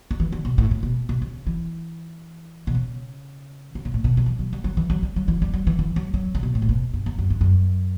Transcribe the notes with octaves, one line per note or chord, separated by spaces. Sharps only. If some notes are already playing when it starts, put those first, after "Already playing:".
D3
E3
D3
B2
A2
A2
B2
B2
C#3
E3
B2
C#3
C#3
B2
A2
B2
F#3
E3
F#3
G3
F#3
E3
F#3
G3
F#3
E3
G3
F#3
E3
E3
F#3
F#3
C#3
B2
A2
C#3
B2
G2
E2
F#2
G2
F#2